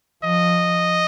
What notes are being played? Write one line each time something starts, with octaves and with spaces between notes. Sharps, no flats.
F3 D#5